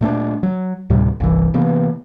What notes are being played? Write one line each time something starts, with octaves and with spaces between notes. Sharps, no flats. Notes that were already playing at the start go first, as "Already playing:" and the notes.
A#2 A3 C4 D4
F#3
D2 A2 C3 G3
G1 C2 E3
C3 E3 A#3 B3